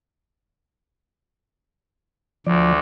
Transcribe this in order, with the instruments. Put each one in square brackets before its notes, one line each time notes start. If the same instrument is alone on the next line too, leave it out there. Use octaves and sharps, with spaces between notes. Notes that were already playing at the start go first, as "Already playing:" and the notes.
[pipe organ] D2 [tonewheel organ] F3 D5